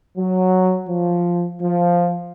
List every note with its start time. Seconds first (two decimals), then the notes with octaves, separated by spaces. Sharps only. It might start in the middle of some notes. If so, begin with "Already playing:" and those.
0.17 F#3
0.88 F3
1.62 F3